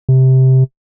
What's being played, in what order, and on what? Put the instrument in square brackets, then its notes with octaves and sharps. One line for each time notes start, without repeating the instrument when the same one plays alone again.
[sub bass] C3